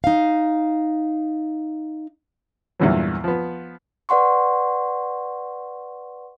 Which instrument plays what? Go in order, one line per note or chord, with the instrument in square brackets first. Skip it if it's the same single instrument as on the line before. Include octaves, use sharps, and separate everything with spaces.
[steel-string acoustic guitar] D#4 F5
[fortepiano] E2 G2 A#2 E3 F#3
F3 B3
[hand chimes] B4 D5 F#5 C6 C#6